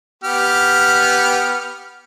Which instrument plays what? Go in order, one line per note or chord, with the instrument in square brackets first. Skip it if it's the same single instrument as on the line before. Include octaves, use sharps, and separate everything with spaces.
[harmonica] B3 G4 F6